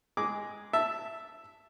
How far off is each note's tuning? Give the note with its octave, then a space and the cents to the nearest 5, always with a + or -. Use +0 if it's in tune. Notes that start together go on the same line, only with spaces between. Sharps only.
G#3 +0 G#4 +0 D6 -10
E5 +0 A5 +0